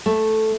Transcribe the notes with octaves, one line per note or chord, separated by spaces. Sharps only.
A3